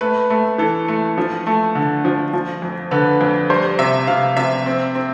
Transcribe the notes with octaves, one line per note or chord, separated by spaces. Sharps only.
A3 B4
A3
E3 A4
A3
F3
A3
D3
F3
F3
F2
D3 B4
F2
G3 C5
C3 E5
C3 F5
C3 E5
C4
C4